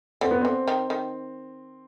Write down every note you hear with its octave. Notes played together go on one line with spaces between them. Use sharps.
D3 C4
B3
D3 C4
D#3
D#3